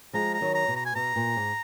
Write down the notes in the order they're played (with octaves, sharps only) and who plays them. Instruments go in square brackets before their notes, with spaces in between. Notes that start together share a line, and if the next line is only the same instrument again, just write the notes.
[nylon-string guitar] F3 G#3 [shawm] A#5
[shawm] A#5
[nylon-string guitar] D#3 F#3
[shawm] A#5
[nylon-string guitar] B2
[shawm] A#5
G#5
[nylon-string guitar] B2 [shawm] A#5
[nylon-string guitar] A#2
G#2